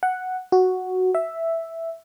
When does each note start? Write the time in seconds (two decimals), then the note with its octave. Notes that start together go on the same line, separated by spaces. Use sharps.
0.03 F#5
0.52 F#4
1.15 E5